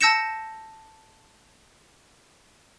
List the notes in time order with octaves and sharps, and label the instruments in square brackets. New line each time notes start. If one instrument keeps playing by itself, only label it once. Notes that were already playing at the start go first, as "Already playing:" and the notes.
[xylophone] A5 E6 G6 A#6 C#7 E7